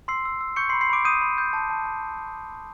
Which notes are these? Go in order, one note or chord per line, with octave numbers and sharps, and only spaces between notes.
C6 E6 C7
E6
E6
C#6 G6 C#7
C6 C7
B5
C6 C7
B5 D6 D7
D#6 G6 D#7
B5
G6
A5
A5
A5